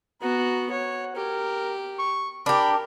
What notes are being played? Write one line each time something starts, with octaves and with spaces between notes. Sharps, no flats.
B3 F#4 A#5
C#5 F#5
G4 A#4
C#6
D4 G4 A#4 B5